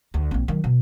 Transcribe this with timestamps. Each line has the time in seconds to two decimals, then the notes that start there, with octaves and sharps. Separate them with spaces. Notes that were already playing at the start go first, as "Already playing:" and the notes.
0.14 D2
0.31 A#1 C4
0.48 D#3 F#3
0.64 B2